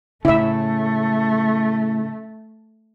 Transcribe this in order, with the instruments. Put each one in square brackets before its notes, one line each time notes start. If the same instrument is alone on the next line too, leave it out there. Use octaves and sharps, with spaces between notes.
[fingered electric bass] A2 C#3 [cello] A3 [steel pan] E4 E5